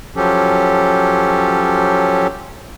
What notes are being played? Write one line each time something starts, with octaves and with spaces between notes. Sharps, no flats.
F3 F#3 C#4 G4 A4